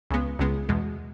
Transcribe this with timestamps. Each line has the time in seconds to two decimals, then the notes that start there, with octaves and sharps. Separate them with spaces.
0.10 C#2 C#3 G#3 B3
0.39 C#2 C#3 G#3 B3
0.69 E2 B2 G#3